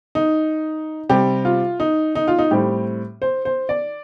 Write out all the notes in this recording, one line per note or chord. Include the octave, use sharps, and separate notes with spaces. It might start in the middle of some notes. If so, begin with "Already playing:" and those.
D#4
C3 G3 C4 G4
F4
D#4
D#4
F4
D#4
A2 G3 C4 G4
C5
C5
D5